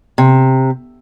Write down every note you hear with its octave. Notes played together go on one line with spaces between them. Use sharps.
C3